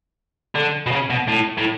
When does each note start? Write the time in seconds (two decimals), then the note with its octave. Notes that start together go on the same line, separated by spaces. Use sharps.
0.55 D3
0.87 B2
0.92 C#3
1.10 B2
1.28 A2
1.57 A2